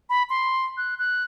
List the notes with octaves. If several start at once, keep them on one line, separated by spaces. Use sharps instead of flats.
B5
C6
F#6
F#6